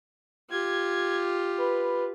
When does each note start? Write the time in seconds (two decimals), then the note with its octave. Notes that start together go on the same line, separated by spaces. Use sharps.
0.50 F4 G4 G#6
1.58 B4